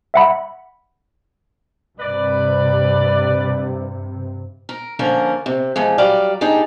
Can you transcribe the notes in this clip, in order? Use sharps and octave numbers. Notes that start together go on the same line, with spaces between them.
E5 F#5 B5
G2 C3 B4 D5
A#4
D3 F3 A#3 C#4 A#4
C3
E3 F3 G#3
F#3 G3 D5 F5
D4 D#4 G4 G#4